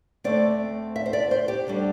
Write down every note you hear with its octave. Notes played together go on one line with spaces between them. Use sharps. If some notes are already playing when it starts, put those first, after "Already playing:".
D2 D3 A3 C4 D5
E5
C5
D5
C5
G4
D2 D3 G3 D4